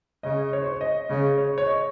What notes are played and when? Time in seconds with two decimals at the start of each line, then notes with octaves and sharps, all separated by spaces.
0.23 C#3 D#5
0.53 C#5
0.62 C5
0.71 C#5
0.81 D#5
1.09 C#3
1.38 C#5
1.58 C#5
1.67 D#5